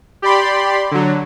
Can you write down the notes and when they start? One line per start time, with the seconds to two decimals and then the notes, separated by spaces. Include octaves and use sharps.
0.22 G4 D5 B5 C6
0.91 D3 F#3